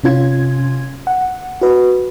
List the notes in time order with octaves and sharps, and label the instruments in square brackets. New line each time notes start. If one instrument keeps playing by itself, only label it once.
[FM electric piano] C3 C#4 F4 G#6
F#5
F#4 B4